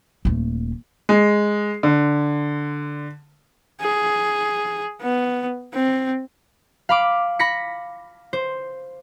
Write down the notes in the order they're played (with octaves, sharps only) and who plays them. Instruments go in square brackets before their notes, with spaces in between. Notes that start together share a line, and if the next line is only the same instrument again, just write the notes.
[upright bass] D#1 A3
[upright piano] G#3
D3
[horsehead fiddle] G#4
B3
C4
[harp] F5 B5 D6
B5 A#6 B6 C#7
C5